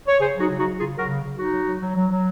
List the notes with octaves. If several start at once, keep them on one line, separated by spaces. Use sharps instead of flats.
C#5
C#3 G#4 C5
F#3 D#4 F#4
C#3
D#4 F#4
F#3
C#3 F4 G#4
F#3
F#4 A#4
C#3
C#3
F#3 D#4 F#4
F#3
F#3
F#3
F#3
F#3